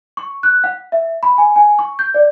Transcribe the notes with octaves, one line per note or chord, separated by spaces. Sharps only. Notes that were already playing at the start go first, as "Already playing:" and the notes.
C#6
F#6
F#5
E5
B5
G#5
G#5
C#6
G6
D5